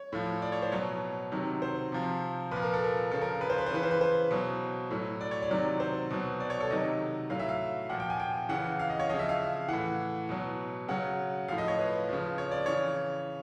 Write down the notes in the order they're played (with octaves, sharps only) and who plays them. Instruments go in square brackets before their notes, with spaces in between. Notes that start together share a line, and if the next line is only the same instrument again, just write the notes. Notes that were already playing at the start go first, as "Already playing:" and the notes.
Already playing: [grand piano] C#5
A2 F3
D5
C#5
C5
B2 F#3 C#5
C3 D#3 F#3
C5
C3 F3
A#2 F3 B4
A#4
A4
A#4
C#3 F3 A4
A#4
B4
C5
B4
C5
C#3 E3 B4
C5
B4
C5
B2 F#3
A2 F#3
D5
C#5
D5
C3 D#3 F#3
C5
B2 F#3
D5
C#5
A4
C3 D#3 F#3 D#5
A2 F#3 F5
E5
F5
A#2 F#5
F3
G5
G#5
G5
C#3 E3 F#5
F5
D#5
C#5
C#3 F3 D#5
E5
F5
A2 E3 F#5
B2 F#3
C#3 F#3 F#5
A2 F3 F5
D#5
C#5
B4
C#3 F3
C#5
D5
C#3 E3 C#5